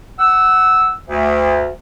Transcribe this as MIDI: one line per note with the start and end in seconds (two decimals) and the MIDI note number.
0.19 0.92 78
0.19 0.92 88
1.08 1.69 38